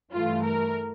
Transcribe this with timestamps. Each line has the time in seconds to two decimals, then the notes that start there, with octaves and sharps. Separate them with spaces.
0.12 G2 E3 A3 F4
0.44 A#4